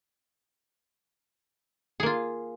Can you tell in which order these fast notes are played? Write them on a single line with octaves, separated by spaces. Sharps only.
G#4 A#3 F4